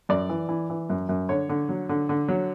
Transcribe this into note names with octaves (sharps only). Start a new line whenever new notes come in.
F#2 D5
E3
E3
E3
F#2
F#2
D3 C#5
D3
F#3
D3
D3
F#3